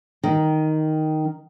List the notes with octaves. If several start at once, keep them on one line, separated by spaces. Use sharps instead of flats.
D#3